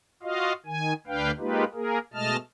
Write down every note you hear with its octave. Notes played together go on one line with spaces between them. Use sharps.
F4 F#4 D#5 F5
D#3 G#5
D2 D4 B4 F5 G5
G#3 A#3 D#4 F4 G4 B4
A#3 G#4 A#4
B2 G#3 A3 D#5 A5 F6